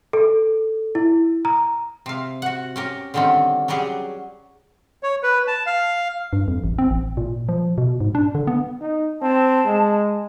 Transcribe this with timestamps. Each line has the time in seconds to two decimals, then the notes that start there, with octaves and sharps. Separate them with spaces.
0.13 A4
0.95 E4
1.45 A#5
2.06 C3 F5
2.42 F#4 F#5
2.76 C#4 G4 A#4
3.14 D3 D#3 G3 C4 C#4
3.68 F#3 G3 C#4 G4 G#4
5.03 C#5
5.23 B4
5.48 A5
5.66 F5
6.33 G2
6.48 F2
6.64 A1
6.78 C4
6.91 A1
7.17 A#2
7.49 F3
7.78 B2
8.01 G#2
8.15 D4
8.35 D3
8.47 B3
8.81 D#4
9.22 C4 A5
9.66 G#3